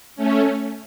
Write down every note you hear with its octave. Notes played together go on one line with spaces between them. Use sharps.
A3 C#4